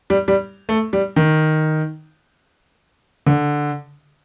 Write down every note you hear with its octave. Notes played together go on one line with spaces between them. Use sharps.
G3
G3
A3
G3
D#3
D3